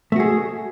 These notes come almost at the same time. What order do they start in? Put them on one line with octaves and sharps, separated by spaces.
A3 F#4 G#4